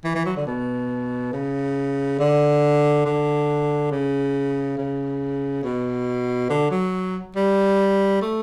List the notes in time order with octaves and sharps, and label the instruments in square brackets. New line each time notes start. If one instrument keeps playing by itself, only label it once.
[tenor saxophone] E3
E3
F#3
D3
B2
C#3
D3
D3
C#3
C#3
B2
D3
F#3
G3
A3